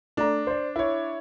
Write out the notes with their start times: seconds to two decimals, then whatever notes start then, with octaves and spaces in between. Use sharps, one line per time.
0.17 A3 D4 A#5
0.47 C5 D5
0.76 E4 C#5